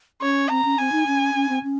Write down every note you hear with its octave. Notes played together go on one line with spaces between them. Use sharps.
C#4 C#5
C4 A#5
C#4
C4 G#5
D#4
C#4
C#4
C4
C#4